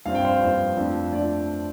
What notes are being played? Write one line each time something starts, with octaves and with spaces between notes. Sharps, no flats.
G2 F3 C4 F5
G5
C5 F5
G2 F3 C4 C5
F2 F3 A3 D4 F4
F2 F3 A3 D4 F4 D5